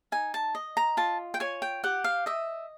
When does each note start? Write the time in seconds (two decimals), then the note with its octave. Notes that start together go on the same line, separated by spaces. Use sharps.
0.12 D#4 G#5
0.34 A5
0.55 D#5
0.77 A#5
0.97 F4 A5
1.34 G5
1.40 C#5 G#5
1.62 G5
1.84 G4 F#5
2.04 F5
2.26 D#5 E5